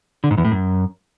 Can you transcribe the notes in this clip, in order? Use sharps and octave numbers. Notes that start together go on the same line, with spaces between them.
D3
G#2
E2
A2
F#2